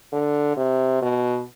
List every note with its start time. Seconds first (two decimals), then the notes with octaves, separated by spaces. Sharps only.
0.13 D3
0.57 C3
1.02 B2